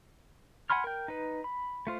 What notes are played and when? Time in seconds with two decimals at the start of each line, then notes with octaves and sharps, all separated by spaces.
0.70 F#5 G#5 B5 C6 F6
0.84 A#4 G5
1.08 D#4 B4
1.44 B5
1.87 A3 F4 C5